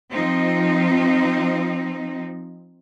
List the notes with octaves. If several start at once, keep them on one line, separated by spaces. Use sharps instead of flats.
F3 C4 D#4